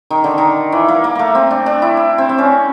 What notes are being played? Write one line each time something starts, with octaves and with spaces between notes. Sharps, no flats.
D#3
D3
D#3
E3
A#3
A#3
A3 A#3
C4
D4
D4
E4
E4
C4
C4
C#4